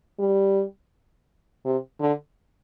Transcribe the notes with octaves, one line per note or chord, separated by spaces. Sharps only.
G3
C3
D3